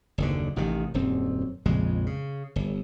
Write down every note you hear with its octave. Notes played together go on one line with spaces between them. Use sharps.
F#1 D#2 D3
A1 C3 D#3
D#1 F#2 C4
A#1 F2 C#3 G#3
C#3
G1